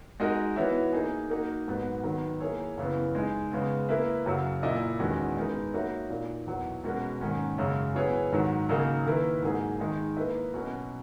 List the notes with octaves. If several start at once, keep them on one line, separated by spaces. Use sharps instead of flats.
G#3 D#4 F#4 A#4 D#5
E3 B3 F#4 C#5 E5
A#3 D#4 G#4
A#3 D#4 F#4
G#2 F#3 B3 F#4
D#3 F#3 B3
A#3 E4 G#4 C#5
F#2 C#3 E3 B3
G#3 D#4 G#4
C#3 G#3 B3
A#3 E4 B4 E5
F#2 C#3 F#3
A#2 A#3 E4 A#4 D#5
E2 D#3 G#3 C#4 F#4
G#3 B3 D#4 A#4
A#3 D#4 F#4 C#5 E5
A#2 A#3 D#4
E2 B2 F#3
B2 G#3 C#4 F#4 A#4
G#2 D#3 A#3 C#4
F#2 C#3 G#3
F#3 B3 E4 G#4 C#5
G#2 D#3 F#3
C#3 F#3 A#3 D#4 G#4
D#3 A#3 E4 B4
G#2 F#3 A#3 D#4 G#4
D#3 G#3 D#4
A#3 E4 B4 D#5
B2 F#3 C#4 F#4